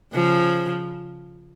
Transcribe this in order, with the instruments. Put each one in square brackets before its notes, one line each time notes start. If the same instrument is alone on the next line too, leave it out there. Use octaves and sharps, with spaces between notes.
[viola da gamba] C#3 F3